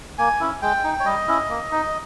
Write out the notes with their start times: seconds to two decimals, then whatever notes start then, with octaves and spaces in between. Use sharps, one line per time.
0.18 A#3 G#5
0.40 C#4 E4
0.62 G#3 G5
0.84 D#4
1.00 C#5
1.05 G3 D#5
1.28 C#4 E4
1.49 A#3
1.72 D#4